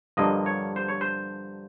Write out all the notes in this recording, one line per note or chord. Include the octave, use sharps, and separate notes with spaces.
G2 D3 F3 A#3 D#5
C#5
C5
C#5
C5